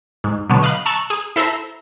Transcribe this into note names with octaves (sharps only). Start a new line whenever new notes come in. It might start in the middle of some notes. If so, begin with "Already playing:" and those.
G#2
B2 D3 F#3 B3
D#5 F5 B5 F#6
A5 A#5 C#6 E6 F#6 A6
G#4
E4 A4 C5 E5 A#5